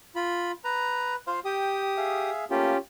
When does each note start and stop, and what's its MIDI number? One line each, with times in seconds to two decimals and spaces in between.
0.16 0.52 65
0.16 0.52 83
0.64 1.16 71
0.64 1.14 82
1.27 1.40 65
1.27 1.40 72
1.27 1.40 77
1.45 2.30 67
1.45 1.82 79
1.45 2.30 87
1.97 2.45 68
1.97 2.45 76
1.97 2.45 77
2.50 2.74 57
2.50 2.74 58
2.50 2.77 61
2.50 2.77 65
2.50 2.77 67